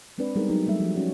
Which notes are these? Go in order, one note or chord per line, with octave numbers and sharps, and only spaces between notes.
G#3 C4 D4 B4 D5
G3 G#3 B3 D#4 G#4 A#4
F#3 G#3 D#4 G#4
F#3 G3 A3 E5
F3
C#4 F#4